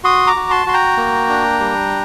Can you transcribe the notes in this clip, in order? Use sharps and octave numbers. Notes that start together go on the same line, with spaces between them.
F#4 C6 D#6
A#5 D6
F#4
A5 C6
F#4 C6
G5 A#5
A#3
D4
G3